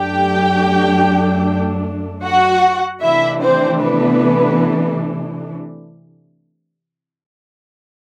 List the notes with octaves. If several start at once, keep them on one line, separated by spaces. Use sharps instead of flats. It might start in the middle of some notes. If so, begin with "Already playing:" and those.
Already playing: F#2 F#3 A3 D4 G4 G5
F#4 F#5
C3 E3 A3 D4 E4 E5
C4 C5
B3 B4